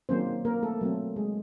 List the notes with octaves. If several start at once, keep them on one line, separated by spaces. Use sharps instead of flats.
D#3 F#3 A#3 C4 C#4 C5
A#3 A#4
A3 A4
F#3 A3 C4
G#3 G#4